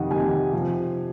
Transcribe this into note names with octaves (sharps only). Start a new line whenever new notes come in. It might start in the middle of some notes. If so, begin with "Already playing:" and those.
Already playing: F2 C3 D#3 D#5 F#5
F2 C3 D#3 G#5
C3 F3